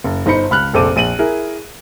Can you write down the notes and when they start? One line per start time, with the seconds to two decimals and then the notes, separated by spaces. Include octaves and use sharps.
0.04 F#1
0.26 G1 D#4 C5 B5 C#7
0.50 C#2 B5 F6 F#6
0.73 F1 A#1 A4 C5 D6 D#7
0.96 A#1 D#7 F#7
1.19 E4 G#4 A#4